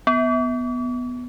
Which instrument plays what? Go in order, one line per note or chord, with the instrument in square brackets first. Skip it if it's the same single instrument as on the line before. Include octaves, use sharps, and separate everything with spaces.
[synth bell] B3